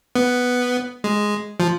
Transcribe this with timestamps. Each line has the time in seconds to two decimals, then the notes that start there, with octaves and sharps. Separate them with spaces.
0.15 B3
1.04 G#3
1.60 F3